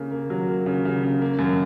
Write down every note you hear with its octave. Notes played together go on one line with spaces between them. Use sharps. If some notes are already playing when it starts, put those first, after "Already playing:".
Already playing: C#3 A#3
A#3
F#3
A#3
C#3
C#3
C#3
A#3
F#2